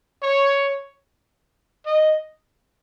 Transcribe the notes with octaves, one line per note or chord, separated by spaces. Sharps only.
C#5
D#5